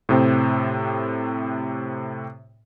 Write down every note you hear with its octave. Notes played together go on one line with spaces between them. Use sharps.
A2 C3 C4